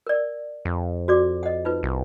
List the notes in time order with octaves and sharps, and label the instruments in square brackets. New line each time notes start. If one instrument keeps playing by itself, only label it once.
[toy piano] A#4 D5
[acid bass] F2
[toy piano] F#4 D5 D6
D#5 F#5
D#4 F4 B4
[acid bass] C2